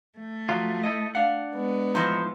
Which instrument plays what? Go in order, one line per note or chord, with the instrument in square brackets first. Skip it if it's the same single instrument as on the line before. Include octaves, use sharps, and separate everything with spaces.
[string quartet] A3
[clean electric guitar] F3 F#3 F4
E4 A4 D#5
[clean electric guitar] D4 F#5 [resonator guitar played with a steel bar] F5
[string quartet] G#3 B3
[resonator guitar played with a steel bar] A2 E3 F3 [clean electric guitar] D#4 C5